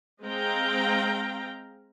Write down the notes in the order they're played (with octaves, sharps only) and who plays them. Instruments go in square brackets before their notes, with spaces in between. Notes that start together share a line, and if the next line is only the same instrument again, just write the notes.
[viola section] G#3 C4 F5 G5 A#5